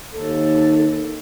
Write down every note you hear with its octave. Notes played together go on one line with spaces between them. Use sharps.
D#2 A4